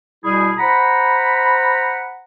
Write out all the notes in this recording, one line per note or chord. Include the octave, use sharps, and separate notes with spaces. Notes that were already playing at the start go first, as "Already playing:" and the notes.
B2 G3 E4 G#4
C5 F#5 A#5 B5